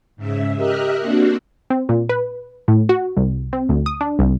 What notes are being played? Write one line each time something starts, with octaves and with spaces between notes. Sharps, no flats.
G#2 C#3 E5
G4 A#4 D#5 E5 F6 F#6
A#3 C4 D4 F#4
C4
A#2
B4
A2
F#4
C2
C4
D2
D#6
D4
C2